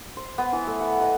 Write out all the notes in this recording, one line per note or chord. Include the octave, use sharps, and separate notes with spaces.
C5
B3
E3
A3
F#5
D#5